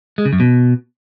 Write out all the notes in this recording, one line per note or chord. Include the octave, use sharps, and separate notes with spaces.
G#3
C#3
F#2
B2